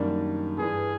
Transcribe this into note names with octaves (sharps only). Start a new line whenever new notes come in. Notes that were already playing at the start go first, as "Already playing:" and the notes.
Already playing: F#2 D#3 G3 A#3 D4
G2 E3 G3 G#4